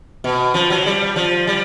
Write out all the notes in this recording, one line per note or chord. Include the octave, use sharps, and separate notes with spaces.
B2
F3
F#3
G3
F3
G3